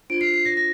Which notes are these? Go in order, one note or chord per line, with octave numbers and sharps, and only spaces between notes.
D4 F4 C5 D7
C7
C7
A#6
A#6